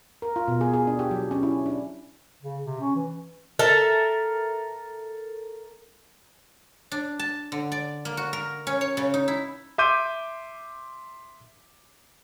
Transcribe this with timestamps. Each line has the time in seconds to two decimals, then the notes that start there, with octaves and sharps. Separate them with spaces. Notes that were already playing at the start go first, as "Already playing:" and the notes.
0.22 A#4
0.36 F4
0.48 B2
0.61 G#4
0.74 G#4
0.87 D4
0.99 G4
1.11 F#3
1.31 C#4
1.43 E4
1.66 D4
2.43 C#3
2.65 C3
2.81 C#4
2.95 E3
3.59 A4 A#4 E5
6.92 D4
7.19 A5
7.52 D3
7.72 D5
8.05 A#3
8.17 F#4
8.33 A#4
8.67 C#4
8.81 C#5
8.97 C#3
9.14 D#4
9.28 E4
9.78 E5 C6 D6 G6 D#7